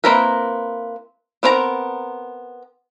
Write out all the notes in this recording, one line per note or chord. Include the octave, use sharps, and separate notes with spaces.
A#3 C4 E4 A#4 B4
B3 C4 D4 A#4 A#5